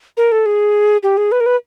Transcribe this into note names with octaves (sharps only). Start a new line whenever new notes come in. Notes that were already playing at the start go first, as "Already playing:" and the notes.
A#4
A4
G#4
G4
G#4
B4
A#4
B4